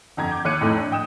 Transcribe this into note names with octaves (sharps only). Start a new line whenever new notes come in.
G1 F2 A#5 G#6
D6 G6
D#2 C#5 D6 F#6 C#7 D#7
F2 A2 A3 D#4
D4
G5 D#6 E7